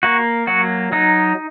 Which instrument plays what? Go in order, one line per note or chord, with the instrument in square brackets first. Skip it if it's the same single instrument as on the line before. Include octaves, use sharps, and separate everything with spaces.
[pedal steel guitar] A#3 F#4
F#3 F#4
F#3 D#4